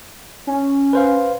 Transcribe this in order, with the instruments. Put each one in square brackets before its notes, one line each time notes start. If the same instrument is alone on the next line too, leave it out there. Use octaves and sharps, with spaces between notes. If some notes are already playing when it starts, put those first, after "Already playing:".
[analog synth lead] C#4
[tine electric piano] B4 C5 F5